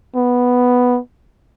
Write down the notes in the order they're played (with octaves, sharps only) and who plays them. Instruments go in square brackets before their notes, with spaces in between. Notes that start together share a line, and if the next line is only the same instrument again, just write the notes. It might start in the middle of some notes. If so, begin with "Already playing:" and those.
[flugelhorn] B3